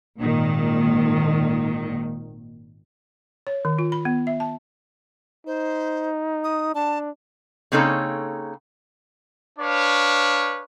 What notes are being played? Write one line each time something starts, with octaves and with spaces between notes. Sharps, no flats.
G#1 A#2 D#3
C#5
D#3
F4
B5
B3
E5
A5
D#4 C5
D#6
D4 A5
C#3 A#3 C4 D#4 A4 C#5
D4 B4 C#5 F5